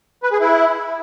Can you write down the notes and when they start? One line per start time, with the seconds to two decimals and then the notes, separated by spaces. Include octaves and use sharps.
0.23 B4
0.32 G#4
0.41 E4